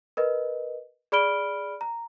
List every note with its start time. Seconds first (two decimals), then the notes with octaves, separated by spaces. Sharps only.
0.17 A#4 B4 D#5
1.12 G#4 D5 B5 F6 D7 G7
1.81 A#5